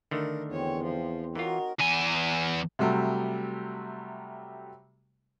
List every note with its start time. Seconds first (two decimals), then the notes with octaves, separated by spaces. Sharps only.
0.11 D3 D#3 A3 A#4
0.51 E2 C4 C#5 G5 G#5
0.83 F3
1.35 E3 D#4 F4 F#4 A#4 C#5
1.79 E2 G#5
2.79 C3 F#3 G3 A3